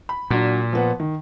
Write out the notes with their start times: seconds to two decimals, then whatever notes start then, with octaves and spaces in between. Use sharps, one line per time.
0.09 B5
0.30 A#2 F#3 D4
0.73 F3 B3 F#5
1.00 D#3